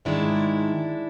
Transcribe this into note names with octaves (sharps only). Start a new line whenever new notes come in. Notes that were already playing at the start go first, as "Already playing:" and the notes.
G#2 D#3 G#3 D4 E4